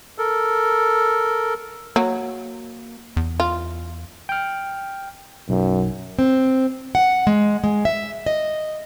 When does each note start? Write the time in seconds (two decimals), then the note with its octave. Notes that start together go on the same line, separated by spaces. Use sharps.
0.18 A4 A#4
1.96 F#3 A#3
3.17 E2
3.40 F4
4.29 G5 F6
5.49 B1 F#2
6.19 C4
6.95 F#5
7.27 G#3
7.64 G#3
7.85 E5
8.26 D#5